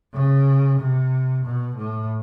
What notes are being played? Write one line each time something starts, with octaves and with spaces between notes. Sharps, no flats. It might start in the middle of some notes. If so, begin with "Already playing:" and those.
C#3
C3
B2
A2